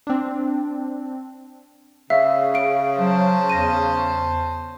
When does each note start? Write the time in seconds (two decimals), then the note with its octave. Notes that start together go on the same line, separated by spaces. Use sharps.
0.07 C4 D4
2.10 C#3 E5 F5 E6
2.54 F5 D7
2.98 F#3 C5 A5
3.50 E2 A#6 D#7